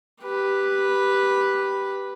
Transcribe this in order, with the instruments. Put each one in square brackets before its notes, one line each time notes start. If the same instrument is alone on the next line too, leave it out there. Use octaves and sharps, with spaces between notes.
[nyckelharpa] G4 B4